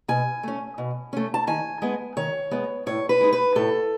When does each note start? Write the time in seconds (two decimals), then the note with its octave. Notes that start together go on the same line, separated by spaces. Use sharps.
0.08 B2 G#5
0.43 A3 C#4
0.78 B2
1.13 A3 C#4
1.34 A5
1.47 D#3 G#5
1.82 G#3 B3
2.17 D#3 C#5
2.51 G#3 B3
2.86 A2 C#5
3.09 B4
3.21 G#3 D#4
3.33 B4
3.55 A2 A4